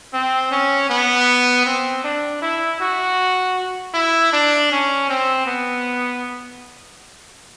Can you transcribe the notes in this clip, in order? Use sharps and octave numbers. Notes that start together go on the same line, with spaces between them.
C4
C#4
B3
C4
D4
E4
F#4
E4
D4
C#4
C4
B3